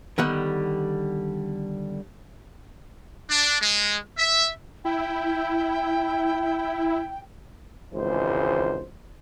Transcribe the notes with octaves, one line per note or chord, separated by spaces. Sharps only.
D3 D#3 G3 B3 F#5
D4
G#3
E5
E4 G5
G#1 C#2 E3 C5